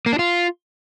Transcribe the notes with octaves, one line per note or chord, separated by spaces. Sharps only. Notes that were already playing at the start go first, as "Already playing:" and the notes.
A#3
D4
F4